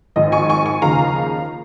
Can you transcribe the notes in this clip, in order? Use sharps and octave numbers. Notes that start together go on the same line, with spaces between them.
G#1 G#2 F3 D#5
G#5 C#6
G#5 C#6
G#5 C#6
D#2 C#3 F3 F5 A#5